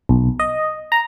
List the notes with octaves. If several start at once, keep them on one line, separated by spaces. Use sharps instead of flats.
B1
D#5
A#5